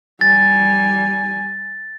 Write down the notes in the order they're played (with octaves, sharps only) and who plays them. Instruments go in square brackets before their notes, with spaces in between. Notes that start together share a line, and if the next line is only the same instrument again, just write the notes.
[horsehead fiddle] G3 G#5 [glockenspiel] A6